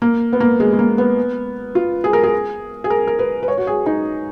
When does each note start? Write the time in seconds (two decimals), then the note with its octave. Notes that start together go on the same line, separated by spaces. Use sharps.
0.02 A#3
0.33 B3
0.40 A#3
0.60 G#3
0.73 G#3
0.79 A#3
0.98 B3
1.75 F4
2.04 G#4
2.13 A#4
2.23 G#4
2.84 G#4
2.90 A#4
3.07 A#4
3.19 B4
3.43 B4
3.48 C#5
3.57 F#4
3.67 G#4
3.86 D#4